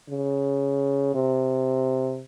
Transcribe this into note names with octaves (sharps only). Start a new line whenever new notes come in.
C#3
C3